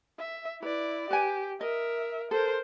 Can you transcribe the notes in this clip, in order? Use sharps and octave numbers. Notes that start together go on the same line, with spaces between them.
E5
E4 B4 D5
G4 B4 G#5
A#4 D#5 E5
A4 A#4 C5